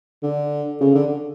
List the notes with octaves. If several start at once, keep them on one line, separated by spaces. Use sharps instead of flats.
D3
C#3
D3